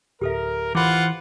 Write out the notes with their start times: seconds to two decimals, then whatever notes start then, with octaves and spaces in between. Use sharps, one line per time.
0.21 D1 G4 A4 A#4 E5
0.75 E3 F4 C5 F#5 B5 D6